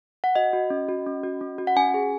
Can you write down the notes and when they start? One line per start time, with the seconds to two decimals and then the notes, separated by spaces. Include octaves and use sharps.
0.24 F#5
0.35 F#4 D#5
0.53 F#4
0.70 C#4
0.88 F#4
1.06 C#4
1.23 F#4
1.41 C#4
1.58 F#4
1.67 F#5
1.76 C#4 G#5
1.94 G#4